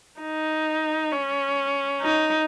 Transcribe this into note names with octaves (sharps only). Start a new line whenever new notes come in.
D#4
C#4
D#4